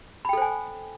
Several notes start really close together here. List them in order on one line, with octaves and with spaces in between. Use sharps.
B5 G5 A4 C5 G#5